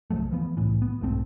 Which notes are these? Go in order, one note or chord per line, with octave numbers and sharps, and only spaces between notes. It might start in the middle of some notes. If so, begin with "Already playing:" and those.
C2 F3 F#3 A3
E3 F3 B3
C2 A2 E3
B3
B1 G#2 A3 C4